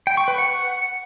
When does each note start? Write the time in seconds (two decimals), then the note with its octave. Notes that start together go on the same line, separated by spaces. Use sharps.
0.07 G5
0.17 C#6
0.28 B4
0.38 F#5